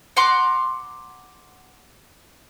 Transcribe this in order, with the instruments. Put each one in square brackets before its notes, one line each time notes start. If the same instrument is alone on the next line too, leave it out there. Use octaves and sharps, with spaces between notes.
[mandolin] F#5 A#5 C6 D6